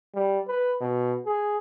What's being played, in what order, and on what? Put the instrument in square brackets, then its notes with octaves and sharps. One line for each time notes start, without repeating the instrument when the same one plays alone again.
[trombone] G3
B4
B2
G#4